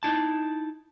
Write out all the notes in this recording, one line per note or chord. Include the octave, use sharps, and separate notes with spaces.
D#4 E4 A5